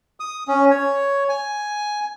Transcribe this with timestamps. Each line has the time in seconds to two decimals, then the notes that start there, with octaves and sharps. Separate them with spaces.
0.20 D#6
0.48 C#4
0.71 C#5
1.29 G#5